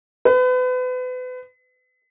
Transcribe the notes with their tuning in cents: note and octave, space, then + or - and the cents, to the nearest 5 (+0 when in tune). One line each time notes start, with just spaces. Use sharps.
B4 +35